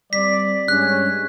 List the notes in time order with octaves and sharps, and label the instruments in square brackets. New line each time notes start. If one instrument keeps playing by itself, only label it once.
[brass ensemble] G3 C4 D5 [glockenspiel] B6
[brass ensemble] G2 G#3 C#4 [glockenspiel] F#6